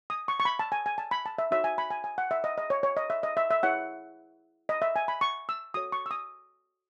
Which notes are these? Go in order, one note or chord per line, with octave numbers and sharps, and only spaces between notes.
D#6
C#6
C#6
B5
A5
G#5
G#5
A5
B5
A5
E5
D#4 F#4 C#5 E5
G#5
B5
G#5
G#5
F#5
E5
D#5
D#5
C#5
C#5
D#5
E5
D#5
E5
E5
E4 G#4 C#5 F#5
D#5
E5
G#5
B5
C#6
E6
F#4 A4 C#5 D#6
C#6
E6
D#6